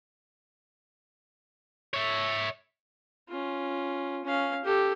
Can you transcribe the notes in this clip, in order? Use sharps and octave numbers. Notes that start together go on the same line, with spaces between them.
C#5 E5
C#4 F4
C#4 F5
G4 A4